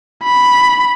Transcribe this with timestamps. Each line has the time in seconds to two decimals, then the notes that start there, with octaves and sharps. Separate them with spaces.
0.24 B5